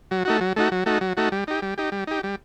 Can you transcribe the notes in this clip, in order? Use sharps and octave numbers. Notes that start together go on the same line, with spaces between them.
F#3
A3 D#4 F#4
F#3
A3 D#4 F#4
F#3
A3 D#4 F#4
F#3
A3 D#4 F#4
G3
D#4 G4
G3
D#4 G4
G3
D#4 G4
G3